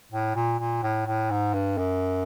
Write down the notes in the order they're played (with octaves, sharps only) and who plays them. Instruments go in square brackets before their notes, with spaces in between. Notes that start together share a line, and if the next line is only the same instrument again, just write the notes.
[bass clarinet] A2
A#2
A#2
A2
A2
G#2
G2
F#2